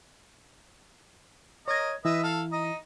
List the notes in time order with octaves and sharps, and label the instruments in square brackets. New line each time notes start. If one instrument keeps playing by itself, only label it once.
[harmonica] A#4 D#5 [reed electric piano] C#5 G#6
[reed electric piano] E3 E4 [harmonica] B4 D#5 E5
[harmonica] A4 F5
D#4 D#5